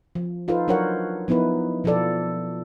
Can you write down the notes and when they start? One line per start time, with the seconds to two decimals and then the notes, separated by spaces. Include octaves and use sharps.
0.15 F3
0.48 D#4 F4 A4 B4 C5
0.68 F#3 D4 A#4 C5 C#5 F#5
1.28 F3 B3 D#4 E4 B4
1.84 B2 F3 F4 A4 D5